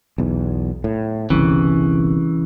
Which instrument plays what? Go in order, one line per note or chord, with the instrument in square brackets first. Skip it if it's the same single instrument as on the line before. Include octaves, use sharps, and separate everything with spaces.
[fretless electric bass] B1 E2
A2
[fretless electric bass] G1 C2 [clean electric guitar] C#3 E3